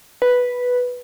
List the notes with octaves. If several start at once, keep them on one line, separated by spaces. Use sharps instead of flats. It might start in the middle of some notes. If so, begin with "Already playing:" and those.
B4